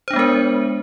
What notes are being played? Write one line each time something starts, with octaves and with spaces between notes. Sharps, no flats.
G#3 B3 D4 A#4 C5